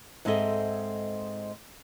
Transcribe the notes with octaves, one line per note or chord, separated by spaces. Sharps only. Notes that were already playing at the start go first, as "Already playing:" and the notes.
G#2 G#3 C4 A4 D#5 E5